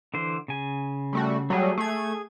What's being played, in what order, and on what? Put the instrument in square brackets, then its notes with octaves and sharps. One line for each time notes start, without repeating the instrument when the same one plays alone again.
[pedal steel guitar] D3 E3 C5
C#3 G#5
[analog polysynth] G3 A3 F#4
[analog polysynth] F#3 G3 [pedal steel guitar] A3 G#4
[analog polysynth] A3 G#6 [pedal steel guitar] G#4